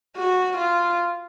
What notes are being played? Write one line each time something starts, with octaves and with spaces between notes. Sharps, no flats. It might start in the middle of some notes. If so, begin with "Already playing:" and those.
F#4
F4